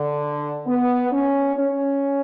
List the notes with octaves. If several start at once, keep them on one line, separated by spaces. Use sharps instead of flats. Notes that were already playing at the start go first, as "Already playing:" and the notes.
Already playing: D3
B3
C#4
C#4